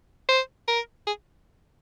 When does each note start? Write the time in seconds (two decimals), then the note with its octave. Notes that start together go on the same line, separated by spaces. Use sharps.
0.29 C5
0.68 A#4
1.07 G#4